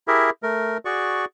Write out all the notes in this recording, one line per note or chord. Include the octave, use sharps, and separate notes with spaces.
E4 G4 G#4 A#4 E5
A3 A#4
F#4 G#4 D5 C#6